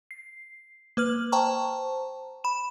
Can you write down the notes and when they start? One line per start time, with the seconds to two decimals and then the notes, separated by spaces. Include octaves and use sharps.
0.11 C7
0.97 A#3 B4 F6 F#7
1.32 C5 G5 A5 A#5 C#6
2.44 B5 E7